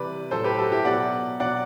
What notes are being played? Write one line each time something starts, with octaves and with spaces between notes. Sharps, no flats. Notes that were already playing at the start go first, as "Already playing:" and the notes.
Already playing: C3 E3 G3 B4 D5
A2 F#3 A4 C5
G4 B4
F#4 A4
E4 G4
B2 F#3 D5 F#5
B2 F#3 D5 F#5